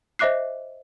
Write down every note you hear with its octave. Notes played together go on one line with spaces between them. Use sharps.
C5 D#5 E5 D6 F#6 C7